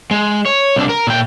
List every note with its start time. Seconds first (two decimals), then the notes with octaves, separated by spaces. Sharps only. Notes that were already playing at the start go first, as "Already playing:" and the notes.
0.11 G#3
0.45 C#5
0.76 C2 D4
0.89 A#4
1.07 A#2 G5